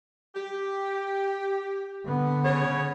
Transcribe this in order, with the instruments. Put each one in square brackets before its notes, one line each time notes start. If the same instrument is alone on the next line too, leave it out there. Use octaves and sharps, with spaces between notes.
[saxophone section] G4
[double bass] D3 B3
[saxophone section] C#3 C#5